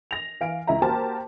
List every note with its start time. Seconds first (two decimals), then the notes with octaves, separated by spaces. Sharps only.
0.11 A#6 F7
0.41 E3 F5 D7
0.67 C#2 E4 E5 A#5
0.82 A#3 F#4 G4 A#4 C5 A5